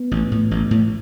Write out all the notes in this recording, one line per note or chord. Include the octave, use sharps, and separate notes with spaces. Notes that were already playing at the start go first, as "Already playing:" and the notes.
Already playing: B3
A1
A2
A1
A2